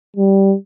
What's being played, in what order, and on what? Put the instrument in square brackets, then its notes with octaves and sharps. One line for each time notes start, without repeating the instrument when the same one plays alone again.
[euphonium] G3